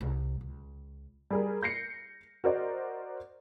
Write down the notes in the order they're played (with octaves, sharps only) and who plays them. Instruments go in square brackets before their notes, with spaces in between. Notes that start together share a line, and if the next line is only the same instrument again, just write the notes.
[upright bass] C2
C#2
[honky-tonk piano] G3 G#4 A#4
G6 A#6 C7 C#7
F#4 A#4 C5 D5 D#5 F#5